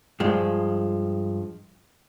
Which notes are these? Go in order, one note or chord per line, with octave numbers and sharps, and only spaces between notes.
G2 F3 G#3